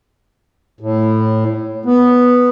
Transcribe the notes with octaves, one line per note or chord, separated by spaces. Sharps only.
A2
B3